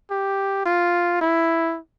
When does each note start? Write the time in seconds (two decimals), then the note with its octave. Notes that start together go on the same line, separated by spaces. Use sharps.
0.11 G4
0.66 F4
1.21 E4